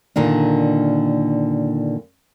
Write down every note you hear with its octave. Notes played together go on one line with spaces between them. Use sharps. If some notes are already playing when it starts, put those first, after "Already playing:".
A#2 D3 D#3 D4